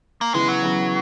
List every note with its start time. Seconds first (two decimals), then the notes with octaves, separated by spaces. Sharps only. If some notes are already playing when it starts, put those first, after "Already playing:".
0.21 A#3
0.34 C#3 E3 G#3 B3
0.48 F#3
0.62 C#3 E3 B3